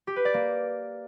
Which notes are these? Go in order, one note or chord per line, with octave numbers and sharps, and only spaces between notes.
G4
B4
D5
A#3